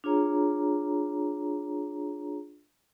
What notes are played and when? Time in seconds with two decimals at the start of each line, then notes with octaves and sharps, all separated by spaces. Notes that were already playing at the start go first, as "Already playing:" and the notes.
0.04 D4 F4 G#4 C#5 A#5